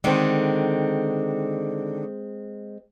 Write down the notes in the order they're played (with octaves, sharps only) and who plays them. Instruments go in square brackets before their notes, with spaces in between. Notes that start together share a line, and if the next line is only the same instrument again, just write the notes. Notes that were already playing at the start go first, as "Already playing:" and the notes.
[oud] D3 D#3 [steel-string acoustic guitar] G#3 C4